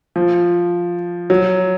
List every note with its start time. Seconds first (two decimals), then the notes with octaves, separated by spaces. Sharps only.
0.16 F3
1.30 F#3